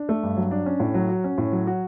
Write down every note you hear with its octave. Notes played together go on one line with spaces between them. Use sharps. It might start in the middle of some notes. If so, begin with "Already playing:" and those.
Already playing: D4
A3
G2
F#3
D4
C#4
A2
F#3
F#4
C#4
A2
F#3
F#4